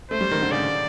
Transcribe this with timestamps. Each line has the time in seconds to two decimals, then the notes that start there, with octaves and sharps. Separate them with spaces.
0.11 A3 C5
0.21 G3
0.31 D#3
0.42 D3
0.51 C#3 D5